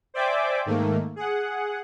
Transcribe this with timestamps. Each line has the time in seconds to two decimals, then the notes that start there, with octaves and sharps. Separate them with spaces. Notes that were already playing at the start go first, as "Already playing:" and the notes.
0.14 C5 D5 E5 G5 G#5 D6
0.66 G#2 D#3 A3 A#3
1.16 G#4 F#5